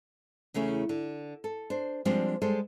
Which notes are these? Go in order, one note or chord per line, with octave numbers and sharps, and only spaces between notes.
E2 C#3 A3 C#4
D3
A4
D4 C5
F3 G3 G#3 C4 D4 C5
G3 G#3 A4 C5